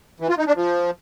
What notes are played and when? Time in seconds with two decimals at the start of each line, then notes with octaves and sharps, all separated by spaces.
0.20 E3
0.29 F4
0.38 D#4
0.47 D4
0.55 F3